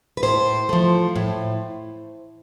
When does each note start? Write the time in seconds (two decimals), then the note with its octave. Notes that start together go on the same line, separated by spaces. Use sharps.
0.17 B4
0.23 A2 C5
0.69 F3 A3
1.16 A2